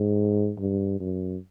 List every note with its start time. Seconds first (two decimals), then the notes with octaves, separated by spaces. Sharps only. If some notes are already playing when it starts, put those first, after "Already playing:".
Already playing: G#2
0.59 G2
1.00 F#2